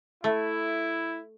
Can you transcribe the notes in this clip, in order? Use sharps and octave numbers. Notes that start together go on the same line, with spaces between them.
A3 E4